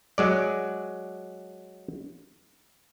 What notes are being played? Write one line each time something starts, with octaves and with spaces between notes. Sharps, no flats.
F#3 G#3 D5